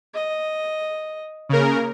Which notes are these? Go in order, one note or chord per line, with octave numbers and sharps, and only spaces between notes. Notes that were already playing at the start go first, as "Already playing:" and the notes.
D#5
C#3 A#3 A#4